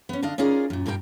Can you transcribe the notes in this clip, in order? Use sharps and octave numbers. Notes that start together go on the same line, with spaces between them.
B3 C#4
D3 D4 D#5 F5
C#4 D#4 F4 G#4 A#4 D5
F#2 A#2
G2 B2 A#4 B4 G5